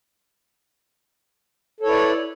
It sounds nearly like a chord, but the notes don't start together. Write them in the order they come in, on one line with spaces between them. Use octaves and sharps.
A4 C#5 E4 B4 D5